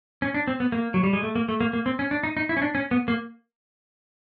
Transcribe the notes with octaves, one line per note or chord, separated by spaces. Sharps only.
C#4
D4
C4
B3
A#3
F#3
G3
G#3
A3
A#3
A3
A#3
A#3
C4
C#4
D4
D#4
D#4
E4
C#4
D4
C#4
B3
A#3